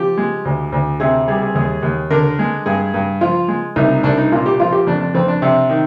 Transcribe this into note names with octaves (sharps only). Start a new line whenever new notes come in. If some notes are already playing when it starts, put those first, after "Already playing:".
Already playing: F3 G4
G#3
D2
D2
C3 G#4
G3 G#4
G#4
D#2 G#4
D#2
D3 A#4
G#3
G2 G#4
G2
F3 F4
G#3
C2 D#4
D#4
C2 D4
D#4
A#2 F4
G4
F3 F4
G4
F2 D4
D4
F2 C4
D4
C3
D#3